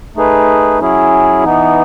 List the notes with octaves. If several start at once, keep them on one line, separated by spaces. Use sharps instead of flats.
A3 D#4 G#4 B4
F#3 C#4 E4 G#4
E3 B3 D#4